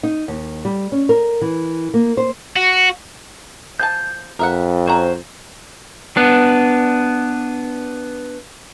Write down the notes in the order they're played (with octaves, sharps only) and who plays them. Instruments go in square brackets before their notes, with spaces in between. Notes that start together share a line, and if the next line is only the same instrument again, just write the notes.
[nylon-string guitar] D#4
D#2
G3
C#4
A#4
E3
A#3
C5
[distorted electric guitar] F#4
[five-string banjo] F3 G#5 A5 [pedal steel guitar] G6
[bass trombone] F2 [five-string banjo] A#4 E5 F#5
[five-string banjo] C#4 F#4 A#5 [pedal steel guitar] C5
[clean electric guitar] B3 D4